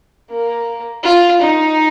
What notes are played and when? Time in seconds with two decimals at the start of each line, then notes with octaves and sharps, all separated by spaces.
0.30 A#3
1.04 F4
1.41 D#4